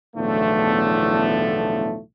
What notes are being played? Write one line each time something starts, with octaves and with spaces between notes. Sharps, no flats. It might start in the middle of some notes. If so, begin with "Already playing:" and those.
B1 E2 A2 D3 F3 A3